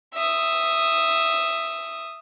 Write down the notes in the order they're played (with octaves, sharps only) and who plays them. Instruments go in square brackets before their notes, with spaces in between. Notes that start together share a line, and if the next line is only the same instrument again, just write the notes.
[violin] E5 D#6